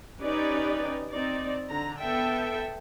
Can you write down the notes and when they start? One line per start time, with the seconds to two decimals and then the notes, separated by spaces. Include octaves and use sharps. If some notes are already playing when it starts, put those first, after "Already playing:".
0.21 C#4 D#4 G4 B4 D5
1.10 C4 D#4 D5
1.69 D3 A#5
1.99 B3 A4 E5 G5